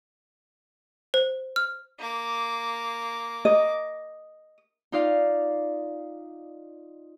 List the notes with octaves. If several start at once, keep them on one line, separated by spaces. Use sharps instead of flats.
C5
F6
A#3 D6
D#5
D#4 F4 D5 F5